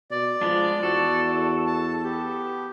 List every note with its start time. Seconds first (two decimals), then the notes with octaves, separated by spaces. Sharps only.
0.11 B2 D5
0.41 F3 G#3 B3 D4
0.83 E2 F#4 A4
1.67 A5
2.04 B3 G4